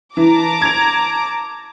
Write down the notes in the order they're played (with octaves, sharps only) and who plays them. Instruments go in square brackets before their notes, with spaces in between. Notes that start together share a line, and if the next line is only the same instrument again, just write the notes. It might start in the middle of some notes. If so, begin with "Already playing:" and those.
[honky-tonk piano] E3 [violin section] A5 A#5 D6
[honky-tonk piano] G#6 F7